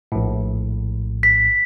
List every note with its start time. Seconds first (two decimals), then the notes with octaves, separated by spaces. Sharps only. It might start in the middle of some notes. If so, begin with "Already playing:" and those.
0.12 A#1 A2
1.23 B6